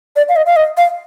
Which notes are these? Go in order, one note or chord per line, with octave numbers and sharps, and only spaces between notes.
D5
F5
D#5
F5
D#5
F5